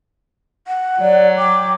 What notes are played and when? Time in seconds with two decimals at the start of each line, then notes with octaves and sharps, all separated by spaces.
0.67 F#5
1.00 F#3 D5
1.38 G5 D6